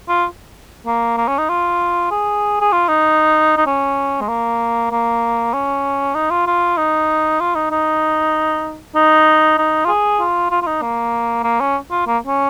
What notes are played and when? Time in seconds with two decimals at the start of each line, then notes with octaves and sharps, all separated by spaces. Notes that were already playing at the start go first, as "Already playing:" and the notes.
0.09 F4
0.87 A#3
1.18 A#3
1.28 C#4
1.38 D#4
1.49 F4
2.11 G#4
2.61 G#4
2.73 F4
2.89 D#4
3.57 D#4
3.67 C#4
4.21 G#3
4.29 A#3
4.91 A#3
5.54 C#4
6.15 D#4
6.31 F4
6.47 F4
6.77 D#4
7.40 F4
7.56 D#4
7.71 D#4
8.95 D#4
9.58 D#4
9.85 F4
9.88 G#4
10.20 F4
10.51 F4
10.62 F4
10.67 D#4
10.82 A#3
11.44 A#3
11.60 C#4
11.91 F4
12.07 A#3
12.27 C#4